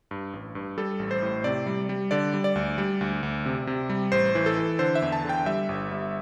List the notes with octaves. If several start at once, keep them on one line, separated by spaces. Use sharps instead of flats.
G2
A1
G2
G3 A4
A1
C5
A2
C3 D5
G3
G3
D3 D5
G3
D5
D2
G3
D2
D2
C3
C3
G3
A1 C5
E3
A4
E3
D3 C5
E5
E2
A5
D3 G5
G3 E5
G1
G3